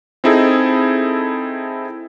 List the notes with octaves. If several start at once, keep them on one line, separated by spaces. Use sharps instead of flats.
C4 D#4 E4 G#4 A4